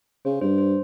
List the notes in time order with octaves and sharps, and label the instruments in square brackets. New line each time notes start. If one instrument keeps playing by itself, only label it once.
[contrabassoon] C#3 [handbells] C5
[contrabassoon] G2 [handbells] C5
[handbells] C5